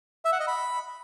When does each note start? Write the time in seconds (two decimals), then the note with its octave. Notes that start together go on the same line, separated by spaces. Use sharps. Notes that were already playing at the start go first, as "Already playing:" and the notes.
0.25 E5
0.32 F#5
0.40 D#5
0.47 B5